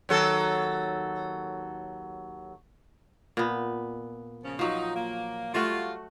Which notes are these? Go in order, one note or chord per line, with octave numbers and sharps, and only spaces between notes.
D#2 F#3 A4
A#2 B3
C#3 F3 C#4
F3 F#3 D#4
A#3
G3 A3 F4 F#4